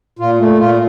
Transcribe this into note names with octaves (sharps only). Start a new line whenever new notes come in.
A#2 F4
A3
A#2 F4